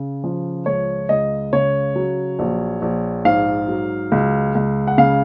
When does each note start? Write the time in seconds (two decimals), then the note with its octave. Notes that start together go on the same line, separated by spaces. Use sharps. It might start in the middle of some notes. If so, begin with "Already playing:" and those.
Already playing: C#3
0.24 F3
0.66 C#2 C#5
1.09 C#2 D#5
1.53 C#3 C#5
1.96 F#3
2.39 A#1
2.82 A#1
3.25 G#2 F5
3.68 F#3
4.12 C#2
4.55 C#2
4.87 F#5
4.98 C#3 F5